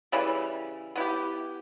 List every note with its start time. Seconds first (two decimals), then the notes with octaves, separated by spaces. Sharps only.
0.12 C#3 E3 G3
0.96 B3 E4 G4